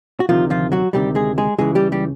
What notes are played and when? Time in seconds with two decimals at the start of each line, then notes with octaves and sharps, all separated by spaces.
0.20 F#4
0.29 D2 C3 D#3 F3 F4
0.50 F3 F4
0.72 F#3 F#4
0.93 D2 C3 D#3 G3 G4
1.15 G#3 G#4
1.38 G#3 G#4
1.58 C#2 C#3 E3 G#3 G#4
1.75 G3 G4
1.92 G3 G4